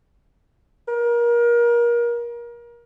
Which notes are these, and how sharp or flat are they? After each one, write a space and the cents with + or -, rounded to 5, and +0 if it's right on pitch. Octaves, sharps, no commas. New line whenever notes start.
A#4 +30